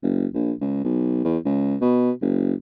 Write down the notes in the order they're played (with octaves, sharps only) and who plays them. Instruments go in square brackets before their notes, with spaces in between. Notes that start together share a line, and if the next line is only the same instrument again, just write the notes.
[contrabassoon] F#1
A#1
C#2
B1
E2
C#2
B2
F#1